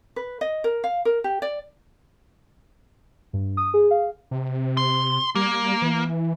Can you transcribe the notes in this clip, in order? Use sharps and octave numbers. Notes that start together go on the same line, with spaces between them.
B4
D#5
A#4
F5
A#4
G4
D5
G2
D#6
G#4
F5
C3
C6
G3 A#3
E3